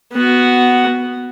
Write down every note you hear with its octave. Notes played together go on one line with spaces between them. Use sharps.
B3 F#4